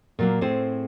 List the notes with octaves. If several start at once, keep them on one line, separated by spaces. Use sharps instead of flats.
A#2 F#3 A#3
A2 C4 G#4 C5